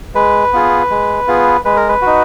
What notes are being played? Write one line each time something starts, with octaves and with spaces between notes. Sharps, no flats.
G#3 B4
B3 F4 G#4
G#3
B3 F4 G#4
G#3 B4
A#4
B4
D#4 F#4